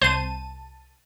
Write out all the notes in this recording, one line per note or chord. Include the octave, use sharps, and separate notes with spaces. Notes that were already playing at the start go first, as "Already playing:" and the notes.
C2 C5 A5 D#7